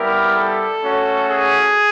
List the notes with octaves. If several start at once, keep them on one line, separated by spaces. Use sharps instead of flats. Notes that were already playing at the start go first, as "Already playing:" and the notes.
Already playing: G3 B3 E4 G4 A#4
A4
A3 C#4 F#4
G#4